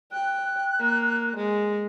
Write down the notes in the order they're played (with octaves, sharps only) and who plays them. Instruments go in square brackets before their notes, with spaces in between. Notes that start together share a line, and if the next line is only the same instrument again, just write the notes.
[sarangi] G5 [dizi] F#6
[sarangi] A#3
G#3